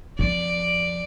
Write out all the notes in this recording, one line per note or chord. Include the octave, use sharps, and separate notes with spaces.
F2 D5